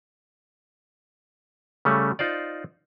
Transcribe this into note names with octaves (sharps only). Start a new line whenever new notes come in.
C#3 G3 A3 C#4
D#4 F4 C5 D5